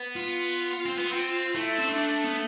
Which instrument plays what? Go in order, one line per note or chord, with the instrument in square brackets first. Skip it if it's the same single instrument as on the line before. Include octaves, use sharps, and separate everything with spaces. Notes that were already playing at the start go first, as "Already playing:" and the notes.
Already playing: [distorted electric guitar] B3
[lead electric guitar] F4
[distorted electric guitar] C4
B3
C4
[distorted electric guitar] A3 [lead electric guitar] E4
[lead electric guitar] C4
D4
B3